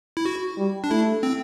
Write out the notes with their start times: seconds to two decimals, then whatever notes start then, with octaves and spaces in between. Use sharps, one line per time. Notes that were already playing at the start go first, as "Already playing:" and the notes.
0.17 E4
0.25 F#4
0.57 G3
0.84 D4
0.90 A3 E4
1.23 C4